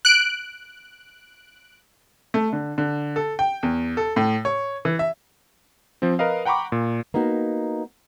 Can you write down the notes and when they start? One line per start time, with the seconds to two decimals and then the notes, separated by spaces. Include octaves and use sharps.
0.05 F#6 D7
2.34 A3
2.53 D3
2.78 D3
3.16 A4
3.39 G5
3.63 E2
3.97 A4
4.16 A2
4.45 C#5
4.85 E3
4.99 E5
6.02 F3 C4
6.19 A#4 B4 D#5 F5
6.45 F#5 G5 A#5 B5 C#6 D6
6.72 A#2
7.14 A#3 B3 D#4 F#4